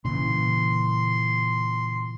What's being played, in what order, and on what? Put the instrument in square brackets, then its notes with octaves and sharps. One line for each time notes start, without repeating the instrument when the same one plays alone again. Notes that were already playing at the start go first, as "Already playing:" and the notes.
[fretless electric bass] A#2 C#3 E3 [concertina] C6